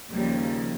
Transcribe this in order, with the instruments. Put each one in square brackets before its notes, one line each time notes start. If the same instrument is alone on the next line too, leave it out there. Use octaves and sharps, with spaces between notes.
[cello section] D#2 C#3 F3 G3